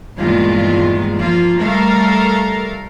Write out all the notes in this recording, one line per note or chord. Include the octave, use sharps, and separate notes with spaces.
E2 G2 A#2 D#3 G#3 F4
F3 A#3 F4
G3 A3 A4 A#4 F5